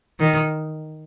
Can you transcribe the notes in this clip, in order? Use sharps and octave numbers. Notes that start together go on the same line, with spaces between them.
D#3